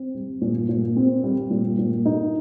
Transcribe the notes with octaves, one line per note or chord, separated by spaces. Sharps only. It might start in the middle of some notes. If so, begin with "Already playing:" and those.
Already playing: C4
G3
A#2
A#2
C4
G3
A#2
A#2
D#4